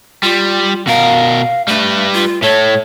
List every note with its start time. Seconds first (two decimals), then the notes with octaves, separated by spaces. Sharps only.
0.23 G3 F4
0.87 B2 A#4 F5
1.68 G3 A3 B4
2.13 F4
2.42 A2 A3 C#5